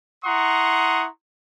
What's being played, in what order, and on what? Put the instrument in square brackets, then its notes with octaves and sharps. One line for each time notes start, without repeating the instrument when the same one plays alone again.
[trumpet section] E4 F#5 A#5 C6 C#6 D#6